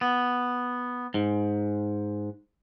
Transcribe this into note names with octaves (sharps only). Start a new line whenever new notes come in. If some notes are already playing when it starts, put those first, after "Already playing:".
B3
G#2